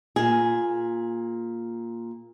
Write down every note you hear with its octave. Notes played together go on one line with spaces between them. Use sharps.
A#2 G#4